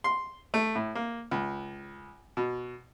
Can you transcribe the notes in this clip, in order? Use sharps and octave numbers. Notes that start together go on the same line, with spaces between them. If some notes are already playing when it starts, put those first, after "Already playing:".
C6
A3
A2
A#3
C#2
B2